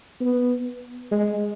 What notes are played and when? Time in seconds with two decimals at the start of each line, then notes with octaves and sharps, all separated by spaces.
0.21 B3
1.11 G#3